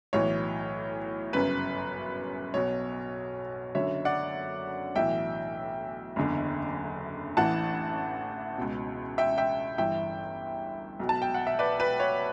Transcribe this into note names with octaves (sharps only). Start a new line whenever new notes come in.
B1 A2 E3 C#5
G1 F#2 C#3 B4
B1 B2 C#5
F#1 F#2 D3 C#5 E5
D5 F#5
B1 A2 E3 E5 G5
F#1 E2 D3
A1 A2 E3 F#5 A5
C#2 B2
E5 G5
E5 G5
G1 G2 E3 E5 G5
B1 B2
A5
G5
F#5
E5
B4 D5
B4
C#5